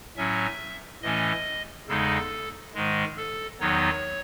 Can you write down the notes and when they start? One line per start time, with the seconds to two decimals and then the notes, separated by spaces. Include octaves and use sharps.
0.16 A2 F#3 C#4 E5
1.02 A2 E3 A3 C#4 D#5
1.88 E2 C#3 G#3 D#4 A4
2.75 G#2 D#3 G#3
3.17 A4
3.60 E2 D#3 F#3 B3 D#4 C#5